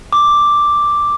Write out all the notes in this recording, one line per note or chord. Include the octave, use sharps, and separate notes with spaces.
D6